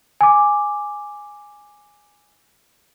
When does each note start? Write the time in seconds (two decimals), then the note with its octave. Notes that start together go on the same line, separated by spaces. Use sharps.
0.21 G#5 D6